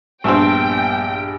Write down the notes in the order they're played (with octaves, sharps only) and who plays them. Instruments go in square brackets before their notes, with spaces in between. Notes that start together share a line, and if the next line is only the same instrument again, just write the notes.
[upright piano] A#1 G2 [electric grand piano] G3 B3 E6 [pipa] A3 C4 [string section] G5